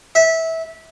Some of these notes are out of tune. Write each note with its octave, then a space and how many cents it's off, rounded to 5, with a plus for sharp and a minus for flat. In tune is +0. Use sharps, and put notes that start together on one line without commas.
E5 -20